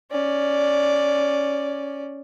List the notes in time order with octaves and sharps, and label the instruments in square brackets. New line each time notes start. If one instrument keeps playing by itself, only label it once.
[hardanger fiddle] C#4 D5